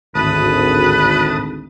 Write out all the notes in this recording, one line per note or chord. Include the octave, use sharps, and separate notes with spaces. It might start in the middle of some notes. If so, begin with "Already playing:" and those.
G#1 D2 A2 B4 A5 D#6